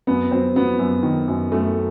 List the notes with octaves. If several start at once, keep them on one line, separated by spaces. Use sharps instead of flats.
F#2 B3
F#3 C4
F#3 B3
F#2
D#3
F#2
F#2 A3